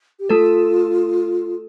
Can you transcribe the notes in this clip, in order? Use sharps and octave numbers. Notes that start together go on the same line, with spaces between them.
G4
A3 F4 A4